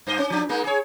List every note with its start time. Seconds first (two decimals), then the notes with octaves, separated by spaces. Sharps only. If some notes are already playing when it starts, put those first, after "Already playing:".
0.07 G2 C5 D#5
0.19 C#4
0.30 F3 D4
0.49 G#3 A#3 D#4
0.64 G#4 C#5